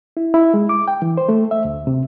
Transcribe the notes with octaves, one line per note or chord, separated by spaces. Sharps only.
E4
E4
G#3
D6
G5
E3
C5
A3
E5
D2
C3